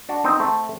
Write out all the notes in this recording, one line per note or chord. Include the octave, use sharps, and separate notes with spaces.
D4 F#4
C4 D#4
A3 C4